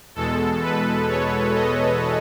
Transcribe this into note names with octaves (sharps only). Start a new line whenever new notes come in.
E2 B2 G#3 A4
B4
C#5
D#5